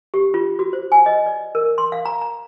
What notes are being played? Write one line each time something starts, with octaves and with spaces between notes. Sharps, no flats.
G4
F4
F#4
C5
G#5
D#5
D5
A#4
C6
F5
A#5
A#5